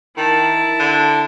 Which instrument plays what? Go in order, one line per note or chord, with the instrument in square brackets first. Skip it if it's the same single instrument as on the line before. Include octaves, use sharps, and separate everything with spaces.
[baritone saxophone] D#3 [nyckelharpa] E4 A5
[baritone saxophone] D3